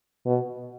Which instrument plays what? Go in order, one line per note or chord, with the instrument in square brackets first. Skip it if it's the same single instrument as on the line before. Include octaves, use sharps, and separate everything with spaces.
[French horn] B2